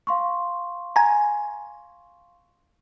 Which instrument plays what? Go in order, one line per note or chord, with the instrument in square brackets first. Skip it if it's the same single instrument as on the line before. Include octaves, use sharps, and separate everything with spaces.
[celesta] F5 C6 C#6
[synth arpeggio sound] G#5 A#5